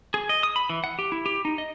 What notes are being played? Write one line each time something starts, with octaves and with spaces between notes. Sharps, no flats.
G#4
D#5
D#6
B5
E3
F#5
G4
E4
G4
D#4
D#5